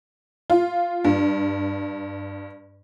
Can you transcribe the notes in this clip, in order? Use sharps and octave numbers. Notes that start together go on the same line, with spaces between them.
F4
G2